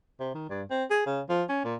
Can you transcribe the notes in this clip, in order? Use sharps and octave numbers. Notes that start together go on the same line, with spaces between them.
C3
D#3
G2
C4
G#4
C#3
F3
C#4
A#2